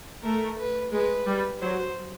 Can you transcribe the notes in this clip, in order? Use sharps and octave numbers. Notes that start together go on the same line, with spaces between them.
A3 A#4
B4
G#3 B4
G3
F#3 C5